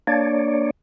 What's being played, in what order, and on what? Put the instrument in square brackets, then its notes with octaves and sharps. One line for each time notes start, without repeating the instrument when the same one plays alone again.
[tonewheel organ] A#3 D4 C#5 D5